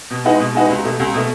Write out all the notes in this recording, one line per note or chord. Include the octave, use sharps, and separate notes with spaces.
B2
G#3 D#4 F#4 B4
B2
G#3 D#4 F#4 B4
C#2
B2 A3
C#2
B2 A3